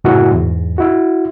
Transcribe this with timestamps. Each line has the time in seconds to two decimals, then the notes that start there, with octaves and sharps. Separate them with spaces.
0.04 F#2 A2 C#3 F#3 E4 F#4
0.32 E2 G#2
0.78 E4 F#4